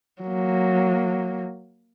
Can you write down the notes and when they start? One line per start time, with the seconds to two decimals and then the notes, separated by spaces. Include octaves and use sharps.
0.22 F#3 A#3